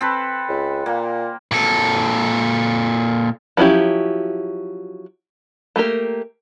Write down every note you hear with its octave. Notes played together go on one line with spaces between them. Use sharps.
C4 A4 B4
C#2
A#2 A#3
A#2 A4
F3 F#3 C#4 E4 G4
A3 A#3 G4 A#4